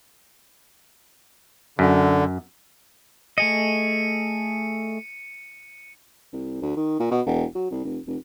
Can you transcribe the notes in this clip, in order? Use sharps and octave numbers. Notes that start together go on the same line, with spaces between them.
F#2 D3
A3 G#4 D#5 C#7 D#7
C2
D2
D#3
A#2
B2
E1
F#3
C2
F1
F1